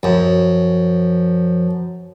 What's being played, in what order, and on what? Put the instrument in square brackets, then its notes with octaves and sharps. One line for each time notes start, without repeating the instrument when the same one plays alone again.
[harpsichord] F#2 [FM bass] F3